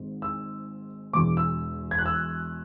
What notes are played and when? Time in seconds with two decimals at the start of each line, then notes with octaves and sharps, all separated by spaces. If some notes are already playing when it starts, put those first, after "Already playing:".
Already playing: G#1 G#2
0.22 E6
1.13 E1 E2 B2 D6
1.37 E6
1.91 G#6
1.98 F#6
2.06 E6